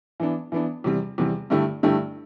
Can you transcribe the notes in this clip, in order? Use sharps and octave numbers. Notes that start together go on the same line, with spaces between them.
E3 B3 D4
E3 B3 D4
E2 C3 G3
E2 C3 G3
G2 D3 A3 E4 G4
G2 D3 A3 E4 G4